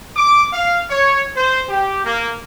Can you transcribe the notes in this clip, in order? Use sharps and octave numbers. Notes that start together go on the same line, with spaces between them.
D6
F5
C#5
C5
G4
A#3